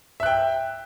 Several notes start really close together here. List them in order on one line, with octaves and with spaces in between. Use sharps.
E5 F#6 G5